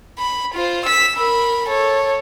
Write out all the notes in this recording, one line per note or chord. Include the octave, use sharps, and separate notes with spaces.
B5
F4 C5
E6 B6
A#4 B5
A4 C#5